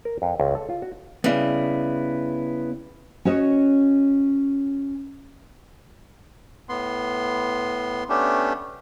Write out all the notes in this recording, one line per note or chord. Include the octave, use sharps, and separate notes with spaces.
A#4
F2
C#2
A4
F4
F#4
C#3 G3 B3 E4
C#4 F#4 C#5 D#5
A2 B3 C6
A3 B3 C#4 D4 G4